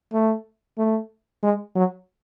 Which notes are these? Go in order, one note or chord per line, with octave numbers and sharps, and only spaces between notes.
A3
A3
G#3
F#3